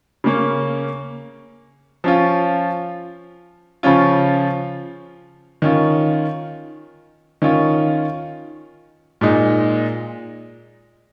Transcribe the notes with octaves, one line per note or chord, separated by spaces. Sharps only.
C#3 A#3 C#4
F3 C#4 F4
C#3 F3 C#4 F4
D#3 C#4 F4
D#3 C#4 F4
A#2 G#3 D#4